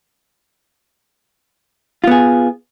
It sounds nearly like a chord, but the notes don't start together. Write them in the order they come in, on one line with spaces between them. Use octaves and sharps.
F4 B3 G#4